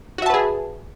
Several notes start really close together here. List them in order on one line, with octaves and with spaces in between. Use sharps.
F#4 E5 A5 B4 G#4